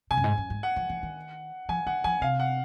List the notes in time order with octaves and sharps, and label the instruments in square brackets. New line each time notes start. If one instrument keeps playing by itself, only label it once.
[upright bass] C3 [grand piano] G#5
[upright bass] F#2
G#2
F#2
G#2
[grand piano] F#5
[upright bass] F3
F3
D#3
[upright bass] F3 [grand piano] G#5
[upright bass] D#3 [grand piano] F#5
[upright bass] F3 [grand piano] G#5
[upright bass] C3 [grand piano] F5
[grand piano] F#5